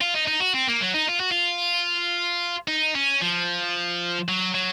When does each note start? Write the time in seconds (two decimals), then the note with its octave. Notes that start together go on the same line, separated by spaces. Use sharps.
0.01 F4
0.14 D#4
0.28 D#4
0.40 F#4
0.54 C4
0.68 A#3
0.81 F#3
0.94 D#4
1.08 F4
1.20 F#4
1.31 F4
2.68 D#4
2.95 C#4
3.21 F3
4.28 F#3
4.54 F#3